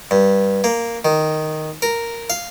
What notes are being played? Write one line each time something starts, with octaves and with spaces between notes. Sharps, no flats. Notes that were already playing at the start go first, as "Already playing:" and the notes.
G2
A#3
D#3
A#4
F5